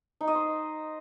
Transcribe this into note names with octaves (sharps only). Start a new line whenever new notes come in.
D#4
D#5
C5